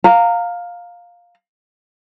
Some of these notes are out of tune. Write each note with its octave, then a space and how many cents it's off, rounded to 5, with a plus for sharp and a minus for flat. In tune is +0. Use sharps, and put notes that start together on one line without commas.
F5 +10 A#5 -20